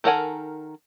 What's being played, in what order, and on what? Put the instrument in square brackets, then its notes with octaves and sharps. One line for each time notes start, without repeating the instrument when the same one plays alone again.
[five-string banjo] D#3 A4 A#4 F#5 G#5